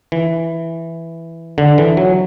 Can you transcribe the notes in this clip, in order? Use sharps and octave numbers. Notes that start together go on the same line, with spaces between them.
E3
D3
E3
F#3